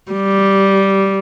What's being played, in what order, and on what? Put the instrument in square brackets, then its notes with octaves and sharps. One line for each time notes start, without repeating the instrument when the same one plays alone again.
[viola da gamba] G3